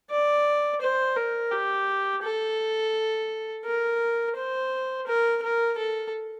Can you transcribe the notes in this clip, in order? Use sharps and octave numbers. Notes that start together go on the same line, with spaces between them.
D5
C5
A#4
G4
A4
A#4
C5
A#4
A#4
A4